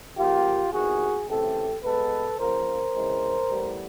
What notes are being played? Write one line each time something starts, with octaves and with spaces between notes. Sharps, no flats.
C#3 F3 A#3 F4 G4
E2 C3 D#3 F#4 G#4
C#3 E3 A3 C4 G4 A4
B2 G#3 B3 A4 B4
C#3 F3 A#3 A#4 C5
C#3 E3 G#3 C4
A2 E3 G3 B3